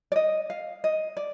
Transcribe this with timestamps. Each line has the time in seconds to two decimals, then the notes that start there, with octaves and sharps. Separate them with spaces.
0.12 D5
0.16 D#5
0.50 F5
0.84 D#5
1.17 D5